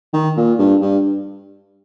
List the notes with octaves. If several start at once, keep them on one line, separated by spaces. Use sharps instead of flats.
D#3
A#2
G2
G2